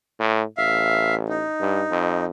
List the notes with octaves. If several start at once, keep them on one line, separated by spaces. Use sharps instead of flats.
A2
A1 E5 F5
D#4
G2
F2